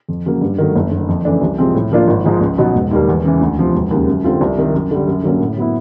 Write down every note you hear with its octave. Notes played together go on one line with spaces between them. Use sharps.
F2
C#3 F#3 A#3
G2
D#3 F#3 A3
F#1
F#2 D3
F2
C#3 E3 A3 D4
C2
C3 F3 G#3 C4
A2
F3 A#3 D4 F4
G#1
G#2 F3 G#3
C#2
B2 F#3 B3 D#4
E1
D#2 D#3 G3 A#3
E2
C#3 E3
D2
C3 F3
E1
D#2 C#3
F#2
D3 G3 C4 F4
C2
C3 D#3
F#2
D3 G3
F#2
D3 F#3 A#3 C#4
A2
F#3 B3 E4